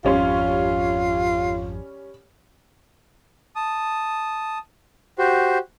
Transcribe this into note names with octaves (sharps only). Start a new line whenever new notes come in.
G#1 F2 G3 C#4 F4 C6
A5 D#6
F#4 G4 C5